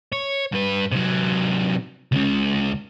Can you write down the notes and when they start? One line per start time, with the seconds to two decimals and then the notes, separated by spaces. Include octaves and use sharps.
0.12 C#5
0.53 G2 B4
0.92 C3 F#3
2.12 C#2 C#3